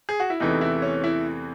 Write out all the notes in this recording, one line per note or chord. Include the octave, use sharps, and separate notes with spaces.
G#4
F#4
E4
E2 C3 E3 A3 D#4
E4
C#4
E4